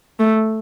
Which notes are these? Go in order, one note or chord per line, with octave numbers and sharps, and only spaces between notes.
A3